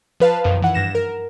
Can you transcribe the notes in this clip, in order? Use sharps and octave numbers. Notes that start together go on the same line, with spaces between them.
F3 B4 F5 A5
B1 F#2 D#3 F3
E3 F#5
G2 A#6 E7
A#4